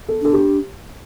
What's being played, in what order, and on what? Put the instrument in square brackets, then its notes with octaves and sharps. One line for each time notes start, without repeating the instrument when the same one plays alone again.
[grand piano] A4
[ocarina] D4 [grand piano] A4
[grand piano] G4